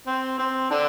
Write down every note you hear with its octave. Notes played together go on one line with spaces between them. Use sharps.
C4
C4
D3 D4